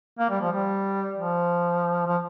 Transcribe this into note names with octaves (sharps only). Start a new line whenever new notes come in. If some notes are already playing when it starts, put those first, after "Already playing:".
A#3
G3
F3
G3
F3
F3